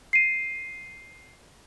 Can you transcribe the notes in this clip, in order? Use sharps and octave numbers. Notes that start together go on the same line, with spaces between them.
C7 D#7